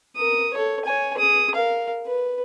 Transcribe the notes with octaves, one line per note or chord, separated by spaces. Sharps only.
A#4 D#6
A4 C#5
C#5 G#5
G#4 D#6
A#4 F5
B4